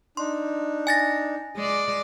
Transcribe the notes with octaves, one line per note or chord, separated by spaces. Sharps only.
D4 D#4 C6
G#5 A6 A#6
G#3 D5